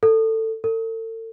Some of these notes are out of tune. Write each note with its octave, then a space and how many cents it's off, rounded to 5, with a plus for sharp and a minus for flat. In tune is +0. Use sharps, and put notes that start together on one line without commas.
A4 +20
A4 +40